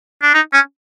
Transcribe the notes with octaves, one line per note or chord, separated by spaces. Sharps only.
D4
D#4
C#4